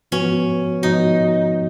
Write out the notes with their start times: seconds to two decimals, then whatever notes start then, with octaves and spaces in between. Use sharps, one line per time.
0.12 G#2 F3 B3 C#4 F#4 B4
0.83 G#2 F3 B3 D#4 F#4 B4